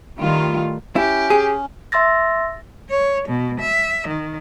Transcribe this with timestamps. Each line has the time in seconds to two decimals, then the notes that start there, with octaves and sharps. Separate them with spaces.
0.19 A2 D#3 G3 A3 F4
0.96 C#4 E4 G4
1.30 G#4
1.92 E5 C6 E6 A6 A#6
2.90 C#5
3.28 B2
3.60 E5
4.07 D#3